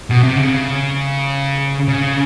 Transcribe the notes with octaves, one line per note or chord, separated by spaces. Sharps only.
B2
C3
C#3
C#3